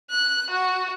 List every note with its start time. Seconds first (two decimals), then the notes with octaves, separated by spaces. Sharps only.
0.10 F#6
0.50 F#4